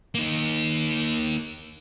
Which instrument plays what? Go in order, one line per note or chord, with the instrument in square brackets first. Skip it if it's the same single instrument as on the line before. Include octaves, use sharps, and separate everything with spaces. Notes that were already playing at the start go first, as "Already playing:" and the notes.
[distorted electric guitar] A#3 D#4